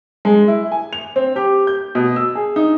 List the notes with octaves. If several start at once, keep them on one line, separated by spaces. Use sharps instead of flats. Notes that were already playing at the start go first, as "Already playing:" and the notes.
G#3
E4
G#5
F7
C4
G4
G6
B2
E6
G#4
D#4